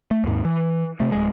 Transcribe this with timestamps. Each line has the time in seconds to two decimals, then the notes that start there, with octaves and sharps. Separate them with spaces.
0.11 A3
0.24 D#2 G#2
0.45 E3
1.00 C3 A3
1.12 D1 G#3